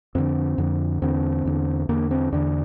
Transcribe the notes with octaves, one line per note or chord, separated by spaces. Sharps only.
F2 D3 C4
F2 D3
E2 D3 C4
E2 D3
E2 D3 A#3
C4
E2 D3 D4